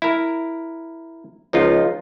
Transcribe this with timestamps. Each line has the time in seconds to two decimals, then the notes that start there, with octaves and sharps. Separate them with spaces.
0.02 E4 A#4
1.53 C#2 F3 D#4 F4